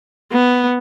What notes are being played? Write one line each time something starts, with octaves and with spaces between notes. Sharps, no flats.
B3